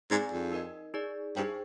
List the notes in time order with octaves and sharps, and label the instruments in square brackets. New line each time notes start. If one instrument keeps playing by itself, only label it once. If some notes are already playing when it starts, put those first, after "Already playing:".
[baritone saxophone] G#2 [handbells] C4 D#4 G#4 D5 G#5
[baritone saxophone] F2
[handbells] D#4 A#4 D#5
D#4 G#4 D5
[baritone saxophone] G2 [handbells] D#4 G#4 C5 G5